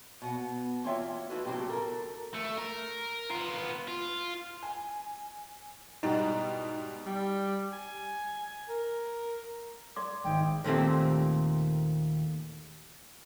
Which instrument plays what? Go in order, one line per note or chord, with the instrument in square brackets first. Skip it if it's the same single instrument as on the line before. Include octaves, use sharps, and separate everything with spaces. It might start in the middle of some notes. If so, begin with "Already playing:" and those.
[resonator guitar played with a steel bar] B2 F#5
E3 A#3 C4 F4 C#5 E5
A3 D#4 E4 F#4 B4
A2 C#3 F#3 C4 F4 G4
A4 A#4
[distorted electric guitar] A3
A#4
B3 F4
F4
[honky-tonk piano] G#5
[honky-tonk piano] G#2 B2 G3 [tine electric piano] D#4
[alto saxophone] G3
G#5
A#4
[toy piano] D5 C6 D6
[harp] G#1 G#3 [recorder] G5
[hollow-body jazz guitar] D#2 A#2 A3 C4